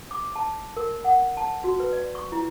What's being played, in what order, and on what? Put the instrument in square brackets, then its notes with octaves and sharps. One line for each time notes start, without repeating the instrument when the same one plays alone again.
[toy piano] D6
A5
A#4
F#5
A5
F#4
B4
D5
C#6
E4